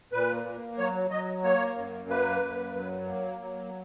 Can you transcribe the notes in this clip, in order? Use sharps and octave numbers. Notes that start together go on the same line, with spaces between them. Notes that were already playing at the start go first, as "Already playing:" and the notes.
A#2 B4
A#3
F#3 C#5
F#3 D#5
A#3 C#5
F#2
A#3 B4
F#2
F#3
A#3
F#3